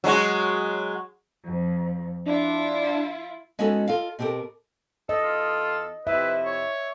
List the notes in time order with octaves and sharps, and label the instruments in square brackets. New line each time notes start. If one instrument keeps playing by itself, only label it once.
[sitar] F#3 G#3 F#4
[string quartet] F2
[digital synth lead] D4 [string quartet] E4 F4
[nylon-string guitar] G#3 B3 C#4 D#4 F#4 A4
F4 A4 D#5 F5
B2 C4 G4 A4 A#4
[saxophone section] E2 A4 [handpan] D#5
[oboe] F4
[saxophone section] F2 C3 E4 [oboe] B4 [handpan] E5
[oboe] C#5